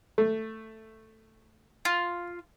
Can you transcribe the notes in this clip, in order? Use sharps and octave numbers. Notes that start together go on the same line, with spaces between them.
A3
F4